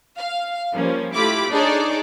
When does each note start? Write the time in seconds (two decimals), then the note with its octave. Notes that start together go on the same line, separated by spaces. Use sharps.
0.18 F5
0.74 F3 G3 A#3 C#4
1.15 A3 E4 F4 G4 B5 D6
1.50 D4 D#4 G#4 A4 C#5 D5